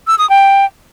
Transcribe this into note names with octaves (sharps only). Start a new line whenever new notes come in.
E6
D#6
G5